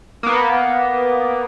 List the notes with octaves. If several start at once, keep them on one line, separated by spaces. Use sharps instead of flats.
A#3 B3